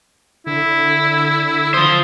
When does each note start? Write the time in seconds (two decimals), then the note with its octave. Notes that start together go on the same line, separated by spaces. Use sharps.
0.47 D3 E4
1.74 F4 C5 D#6